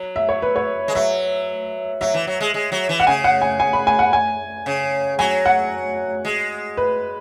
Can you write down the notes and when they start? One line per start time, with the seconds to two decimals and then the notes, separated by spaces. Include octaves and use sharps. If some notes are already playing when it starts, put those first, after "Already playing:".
Already playing: F#3
0.16 E5
0.29 C#5
0.42 B4
0.56 C#5
0.88 G#3
0.95 F#3 E5
2.01 F#3 E5
2.14 E3
2.27 F#3
2.41 G#3
2.54 G#3
2.72 F#3
2.89 E3
3.00 F#5
3.07 C#3 G#5
3.24 F#5
3.42 G#5
3.60 G#5
3.73 B5
3.87 G#5
3.99 F#5
4.13 G#5
4.66 C#3
5.19 F#3 G#5
5.46 F#5
6.25 G#3
6.77 B4